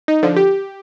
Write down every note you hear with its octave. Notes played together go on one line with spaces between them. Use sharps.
D#4
D3 F3
G4